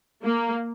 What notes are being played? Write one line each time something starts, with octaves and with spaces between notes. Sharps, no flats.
A#3